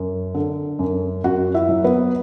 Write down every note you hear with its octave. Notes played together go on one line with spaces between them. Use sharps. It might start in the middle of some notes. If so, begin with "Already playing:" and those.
Already playing: F#2
D3
F#2
F#2 F#4 F#5
E4 E5
F#3
B3 B4